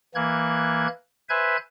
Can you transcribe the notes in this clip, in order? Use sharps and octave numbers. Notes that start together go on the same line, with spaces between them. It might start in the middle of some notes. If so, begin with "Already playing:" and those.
E3 A#3 F#6 G#6
B4 C5 E5 G#5 F#6 G#6